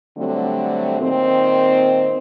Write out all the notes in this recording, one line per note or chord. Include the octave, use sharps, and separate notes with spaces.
D3 F#3 G3 A3 C4
A#2 D#3 C4